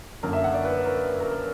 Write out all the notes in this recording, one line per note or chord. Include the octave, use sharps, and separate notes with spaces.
F#2 D3 A#3 A#4
E5
F#5
D5
B4
A#4
A#4